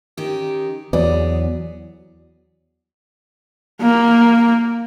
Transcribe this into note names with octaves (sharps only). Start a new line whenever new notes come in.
D#3 C#4 G4
E2 F#3 B3 G#4 D5
A#3